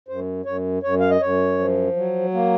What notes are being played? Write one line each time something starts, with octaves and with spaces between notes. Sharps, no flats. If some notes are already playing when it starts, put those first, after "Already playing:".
F#2 C5
F#2 C#5
F#2 C#5
F5
D#5
F#2 C#5
F3
F#3
A#3